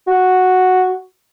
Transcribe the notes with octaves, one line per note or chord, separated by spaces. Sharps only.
F#4